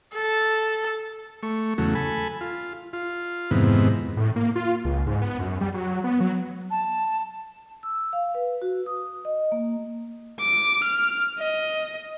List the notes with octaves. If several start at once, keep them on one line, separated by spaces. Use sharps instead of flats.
A4
A3 C#6
E2 C#3 F#3 A3
A4 G#5 B5
F4
F4
F2 G#2 C3 D#3 E3 B3
A2
A#3
F4
C#2
G#2
B3
F#2
G3
F#3
B3
F#3
A5
E6
F5
B4
F#4
D#6
D#5
A#3
D6
F6
D#5